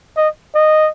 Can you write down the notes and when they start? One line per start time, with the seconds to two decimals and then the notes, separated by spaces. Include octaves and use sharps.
0.17 D#5
0.55 D#5